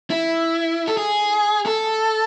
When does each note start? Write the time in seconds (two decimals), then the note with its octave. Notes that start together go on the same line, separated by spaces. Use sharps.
0.10 E4
0.87 A4
0.97 G#4
1.66 A4